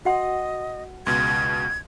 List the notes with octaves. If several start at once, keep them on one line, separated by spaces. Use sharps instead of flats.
F#4 D#5 F#5 C6
C#2 B2 C6 G#6